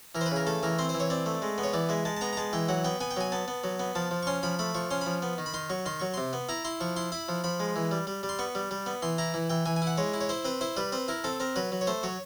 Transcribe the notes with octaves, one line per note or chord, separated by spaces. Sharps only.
E3 A#4
C5
B4
C#3 A#4
A3 A4
E3 A#4
C4 C5
C5
E3
C#5
C4 D5
A3
G#3
B3
C#5
E3 D5
G#3 E5
G#3 A5
A5
B3 A#5
A#5
G#3 A5
E3 G5
F#3 F#5
B3 G5
B3 G#5
G5
F#3 G#5
B3 A5
B3
F#3
B3
F3 A5
F3
C#6
C#4 C6
F3 B5
A3 B5
F3 C#6
C#4 C6
B5
F3
B3
D#3
B5
D#3 C6
F#3 C#6
D#3 C6
F#3 C#6
C3 C6
B3
E4 A#5
E4 C6
F3 C#6
E4 C6
E4 B5
F3
F3 B5
G#3
E3
G3
G3
G3
C6
B3 C#6
G3
G3
B3
E3 C6
E4 A#5
E3
E3 G5
E3 G#5
G#5
E4
F#5
G#3 C#5
E4
C#5
E4 C5
C4 B4
E4 C5
G3 B4
C4 B4
E4 A#4
C4 A4
C4 A#4
F#3 B4
F#3
C#5
A3 C5
F#3 C#5